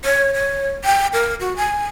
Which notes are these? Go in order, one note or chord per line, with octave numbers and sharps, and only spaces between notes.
C#5
C#5
G5
A#4
F#4
G#5